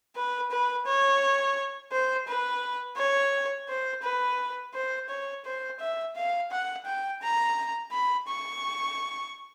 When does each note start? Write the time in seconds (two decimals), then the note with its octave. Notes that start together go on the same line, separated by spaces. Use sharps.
0.16 B4
0.51 B4
0.86 C#5
1.92 C5
2.27 B4
2.97 C#5
3.69 C5
4.03 B4
4.74 C5
5.09 C#5
5.45 C5
5.80 E5
6.16 F5
6.51 F#5
6.85 G5
7.22 A#5
7.92 B5
8.28 C#6